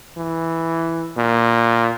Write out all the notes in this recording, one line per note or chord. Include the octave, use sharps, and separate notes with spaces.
E3
A#2